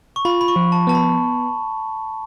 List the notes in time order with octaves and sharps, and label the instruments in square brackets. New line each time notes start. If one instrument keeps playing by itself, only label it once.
[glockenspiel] C#6
[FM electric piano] F4 [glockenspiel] B5
[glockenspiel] B5
C#6
[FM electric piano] F3
[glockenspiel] A5
[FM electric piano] B3 [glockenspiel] A5
[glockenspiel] B5